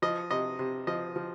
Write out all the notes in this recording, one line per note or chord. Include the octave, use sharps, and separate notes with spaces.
F3 D#5
C3 D#5
C3
F3 D#5
F3